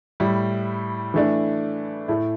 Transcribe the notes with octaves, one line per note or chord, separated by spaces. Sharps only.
A2 G3 E4
E3 A3 D4
A2 A3 E4